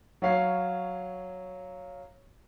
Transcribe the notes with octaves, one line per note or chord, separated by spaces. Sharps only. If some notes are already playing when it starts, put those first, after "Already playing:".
F#3 C#5 F5 C7